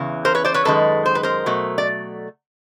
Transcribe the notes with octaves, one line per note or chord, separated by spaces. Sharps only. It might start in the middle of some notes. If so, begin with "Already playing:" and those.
Already playing: E2 C#3 E3
A#4 C5
B4 C#5
C5 D5
B4 C#5
F#2 D#3 G#3 A4 B4
C5
B4
A#4 C5
B2 F#3 A3
D5